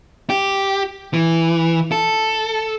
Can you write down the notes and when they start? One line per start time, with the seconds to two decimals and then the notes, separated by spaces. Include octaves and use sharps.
0.30 G4
1.14 E3
1.92 A4